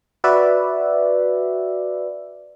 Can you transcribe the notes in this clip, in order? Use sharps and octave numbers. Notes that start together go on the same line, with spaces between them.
F#4 B4 D5 E5